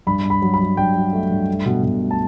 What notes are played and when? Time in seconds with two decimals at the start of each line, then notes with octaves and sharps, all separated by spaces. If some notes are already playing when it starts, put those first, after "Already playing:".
0.07 G2 B5
0.24 G2
0.30 B5
0.42 F#3
0.54 B5
0.60 F#3
0.77 G2 G5
0.95 F#3
1.13 A3
1.30 G2
1.48 A3
1.66 B2
1.83 B2
2.01 A3
2.11 A5